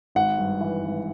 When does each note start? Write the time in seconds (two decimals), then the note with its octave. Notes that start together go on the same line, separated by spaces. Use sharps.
0.15 G#1 F#5
0.38 G2
0.61 E3
0.83 G#1